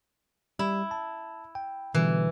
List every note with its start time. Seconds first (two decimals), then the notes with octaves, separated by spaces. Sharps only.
0.59 G3 E4
0.91 A5
1.55 G5
1.94 B2 D3 E3 G3